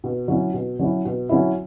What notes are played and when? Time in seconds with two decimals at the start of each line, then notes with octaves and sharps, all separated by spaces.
0.04 B2
0.28 F#3 C#4 E4
0.54 B2
0.79 F#3 C#4 E4
1.05 B2
1.29 F#3 C#4 E4